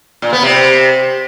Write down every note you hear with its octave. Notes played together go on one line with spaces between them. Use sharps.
A#2
B3
C3